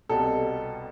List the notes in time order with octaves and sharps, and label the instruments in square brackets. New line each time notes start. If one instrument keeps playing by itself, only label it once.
[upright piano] C2 B2 G3 A4